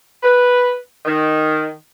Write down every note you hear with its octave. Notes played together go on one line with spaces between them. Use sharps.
B4
D#3